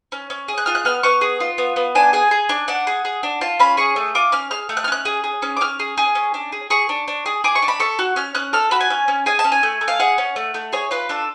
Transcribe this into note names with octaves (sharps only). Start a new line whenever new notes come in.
C#4
C#4
G#4
F#6
F4 F6
F#6
B3 F6
B3 C#6
G#4
F4
B3
B3
D4 G#5
G#4 G#5
G#4
D4
D4 F#5
G#4
G#4
D4
F4 A5
C#4 B5
G#4 C#6
A3
F4 D6
C#4 F6
G#4 F6
A3
F#6
F6
C#4 F#6
G#4
G#4
C#4
D6
C#4 F6
G#4
G#4
C#4
D4
G#4
G#4 C#6
D4
D4
G#4
G#4 D6
C#6
D4
B5
A4 C#6
F#4
C#4 F6
C#4 F#6
A4 F6
F#4 B5
G#5
C#4
C#4
G#4 G#5
A5
C#4
G#5
A3
A3
F5
G#4 F#5
C#4
A3
A3
G#4 C#5
F4 B4
D4 A4